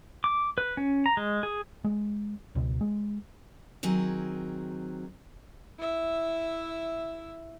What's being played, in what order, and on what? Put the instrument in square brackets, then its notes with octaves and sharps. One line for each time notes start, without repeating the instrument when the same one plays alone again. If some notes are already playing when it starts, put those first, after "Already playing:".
[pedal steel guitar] D6
B4
C#4
A#5
G#3
G#4
[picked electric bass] G#3
C#2 B2
G#3
[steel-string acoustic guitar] D#3 F#3 C4 G#4
[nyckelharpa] E4 E5